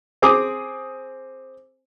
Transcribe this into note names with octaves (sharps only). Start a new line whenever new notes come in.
C4 G#4 D6 D#6